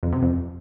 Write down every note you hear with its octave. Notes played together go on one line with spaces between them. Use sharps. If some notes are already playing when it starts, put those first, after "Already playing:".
F2
C3
F2